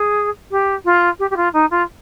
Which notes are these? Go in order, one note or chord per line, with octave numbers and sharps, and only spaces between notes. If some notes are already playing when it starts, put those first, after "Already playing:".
Already playing: G#4
G4
F4
G4
G4
F4
D#4
F4